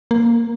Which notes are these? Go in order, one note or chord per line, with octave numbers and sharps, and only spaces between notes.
A#3